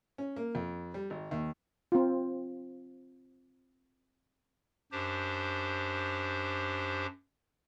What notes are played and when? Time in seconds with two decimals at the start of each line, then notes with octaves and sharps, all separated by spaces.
0.18 C#4
0.36 A#3
0.55 F2
0.94 G3
1.10 G#1
1.31 D#2
1.92 C4 F4
4.92 F#2 D4 G4 C5